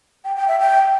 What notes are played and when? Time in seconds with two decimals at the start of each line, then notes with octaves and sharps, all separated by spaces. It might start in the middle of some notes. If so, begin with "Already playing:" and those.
0.25 G5
0.36 G5
0.48 E5
0.60 G5